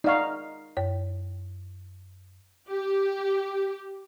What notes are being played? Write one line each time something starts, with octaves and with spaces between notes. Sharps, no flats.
D#4 D5 F5 F#5 C#6
F#2 C#5
G4